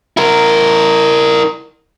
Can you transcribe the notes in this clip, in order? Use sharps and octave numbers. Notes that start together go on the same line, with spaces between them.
E4 A#4